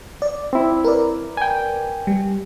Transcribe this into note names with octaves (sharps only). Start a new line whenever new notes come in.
D5
C4 E4
A#4 B4 D5
G5 G#5
G3